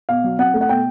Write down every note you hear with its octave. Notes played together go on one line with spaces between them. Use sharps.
B2 F5
F#3
C4 F#5
A3
F#5
B2 G5